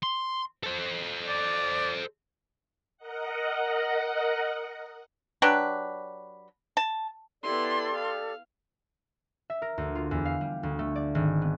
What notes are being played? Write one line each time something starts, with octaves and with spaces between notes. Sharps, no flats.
C6
A4 C5
D5
A#4 D#5 F#5
F#3 D4 G4 B4
A5
B3 E4 G4 A4 D5 C6
F5
E5
A#4
D2
F4
E2
F5
G3
D2
A3
D5
G#1
B3